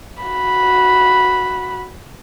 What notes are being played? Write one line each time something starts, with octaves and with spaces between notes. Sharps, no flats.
F#4 B5